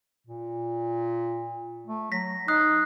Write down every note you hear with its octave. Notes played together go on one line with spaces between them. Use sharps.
A#2
A3
F#3 A#6 B6
D#4 D#6 F#6 C7